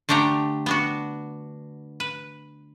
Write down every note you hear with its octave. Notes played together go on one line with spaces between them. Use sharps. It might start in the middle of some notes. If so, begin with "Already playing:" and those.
D3 A3 D4 G4 A#5
B3 D4 F#4
B4